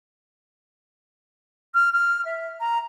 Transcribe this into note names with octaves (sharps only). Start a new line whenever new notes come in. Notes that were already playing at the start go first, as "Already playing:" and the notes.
F6
F6
E5
A#5